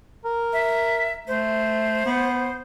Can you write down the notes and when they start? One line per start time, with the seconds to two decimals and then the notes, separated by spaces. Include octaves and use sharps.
0.25 A#4
0.53 E5
1.28 A3 C5
2.06 B3